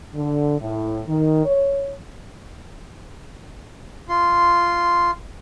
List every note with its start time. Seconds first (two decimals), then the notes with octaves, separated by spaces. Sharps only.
0.14 D3
0.59 A2
1.07 D#3
1.45 C#5
4.09 F4 C6